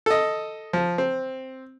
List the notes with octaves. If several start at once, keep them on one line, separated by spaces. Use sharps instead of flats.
A4 D#5
F3
C4